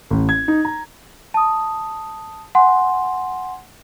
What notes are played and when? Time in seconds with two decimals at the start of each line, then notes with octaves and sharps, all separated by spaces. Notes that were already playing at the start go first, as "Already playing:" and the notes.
0.10 A1
0.29 G#6
0.48 D#4
0.65 A#5
1.34 A5 D#6
2.55 F#5 G#5 C6